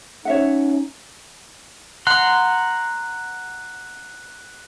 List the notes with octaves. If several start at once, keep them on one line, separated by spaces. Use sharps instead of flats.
C#4 D#4 C#5 E5 F#5
F#5 A#5 C6 F#6